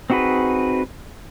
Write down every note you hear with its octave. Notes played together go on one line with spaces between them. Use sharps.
C4 D#4 F#4 G#4 B4